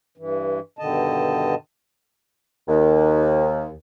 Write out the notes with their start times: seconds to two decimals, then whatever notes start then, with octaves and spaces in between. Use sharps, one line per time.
0.18 G2 E3
0.79 G2 B2 D3 D#3 D#5 A5
2.68 D#2